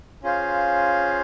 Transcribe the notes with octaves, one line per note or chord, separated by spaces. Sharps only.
C#4 F4 G#4 C5 F5